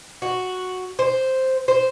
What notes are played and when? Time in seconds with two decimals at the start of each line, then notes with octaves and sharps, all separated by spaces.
0.22 F#4
0.99 C5
1.68 C5